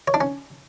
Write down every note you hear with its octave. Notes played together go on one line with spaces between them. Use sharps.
C#5
D4
C#4